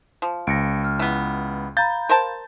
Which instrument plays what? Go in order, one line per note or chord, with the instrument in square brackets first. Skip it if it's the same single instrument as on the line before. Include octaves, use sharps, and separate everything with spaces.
[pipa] F3
[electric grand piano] C#2 [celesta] A#6 C#7 D7
[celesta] F6
[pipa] E3 B3
[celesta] F5 A#5 B5 [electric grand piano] G6 A6
[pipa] A#4 C5 A5